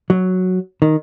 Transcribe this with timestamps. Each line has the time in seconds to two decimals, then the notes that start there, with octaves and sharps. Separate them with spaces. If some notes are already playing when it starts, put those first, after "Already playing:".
0.10 F#3
0.82 D#3